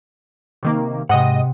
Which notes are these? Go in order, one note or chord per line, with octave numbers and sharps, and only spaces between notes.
C3 D#3 A#3
G#2 C3 D#5 F#5 D#6